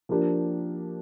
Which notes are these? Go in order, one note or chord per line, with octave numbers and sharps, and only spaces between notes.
F3 A#3 D4 G4